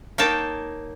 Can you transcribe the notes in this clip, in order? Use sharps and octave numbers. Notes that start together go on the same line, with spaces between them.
A#3 D#4 C#5 G5 A5